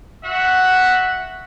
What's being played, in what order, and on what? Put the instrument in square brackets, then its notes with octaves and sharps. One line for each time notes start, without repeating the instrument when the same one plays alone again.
[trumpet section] F#4 E5 F#5